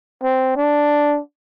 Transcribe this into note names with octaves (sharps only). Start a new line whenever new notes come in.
C4
D4